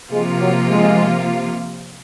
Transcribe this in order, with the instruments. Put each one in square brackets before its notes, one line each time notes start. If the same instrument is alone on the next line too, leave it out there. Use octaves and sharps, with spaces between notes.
[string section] C3 F3 A#3 F4 [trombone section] G#3
[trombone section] F#3
G#3